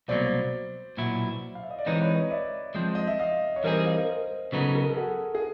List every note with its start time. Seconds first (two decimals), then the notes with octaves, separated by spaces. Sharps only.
0.08 C2 B2 F#3 A#3 C5 D5
0.97 B1 A#2 F#3 B3 E4
1.55 F5
1.63 E5
1.71 D#5
1.79 D5
1.86 E3 G#3 C4 D#4 B4 C#5
2.01 B4 C#5
2.16 C#5 D#5
2.31 D5 E5
2.75 F3 G#3 C4
2.95 D#5
3.07 E5
3.20 D#5 F5
3.56 C#5
3.63 E3 G3 C4 D#4 G#4 A#4 C5
3.86 D#5 F5
3.97 A#4 C5
4.09 A#4 C5
4.52 C#3 F#3 B3 D#4 A4 B4
4.75 G#4 A#4
4.91 A4
4.97 F#4 G#4
5.35 G#4